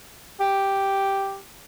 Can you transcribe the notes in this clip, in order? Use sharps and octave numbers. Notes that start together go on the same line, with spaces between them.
G4